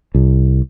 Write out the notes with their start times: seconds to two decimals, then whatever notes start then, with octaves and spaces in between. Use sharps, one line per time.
0.14 C2